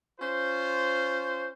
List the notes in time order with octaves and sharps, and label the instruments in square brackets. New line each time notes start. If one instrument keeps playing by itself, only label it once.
[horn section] C#4 F4 C5